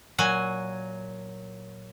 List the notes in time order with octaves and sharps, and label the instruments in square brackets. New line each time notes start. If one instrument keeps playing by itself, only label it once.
[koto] A#2 F#3 G#5